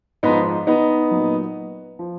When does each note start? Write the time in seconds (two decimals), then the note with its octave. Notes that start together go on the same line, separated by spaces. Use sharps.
0.23 G#2 F3 B3 D#4
0.67 B3 D#4
1.11 A#2 F#3
1.99 F3